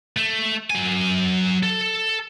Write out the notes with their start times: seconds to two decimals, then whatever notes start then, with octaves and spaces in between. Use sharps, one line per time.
0.17 A3
0.70 F#3 G#5
1.63 A4